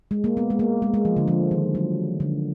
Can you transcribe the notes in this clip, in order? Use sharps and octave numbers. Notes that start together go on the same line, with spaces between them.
G#3
A#3
B3
G#3
A#3
G#3
G#3
F3
D3
F3
D#3
F#3
D3